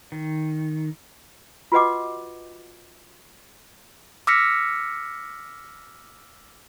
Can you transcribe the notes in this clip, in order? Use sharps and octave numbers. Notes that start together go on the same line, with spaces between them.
D#3
F4 F#4 B4 D#5 F#5 D6
D6 E6 F6 A#6 B6 C#7